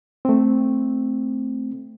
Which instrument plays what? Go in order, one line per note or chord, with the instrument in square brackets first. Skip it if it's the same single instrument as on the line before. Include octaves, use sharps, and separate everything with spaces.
[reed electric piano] A3 C4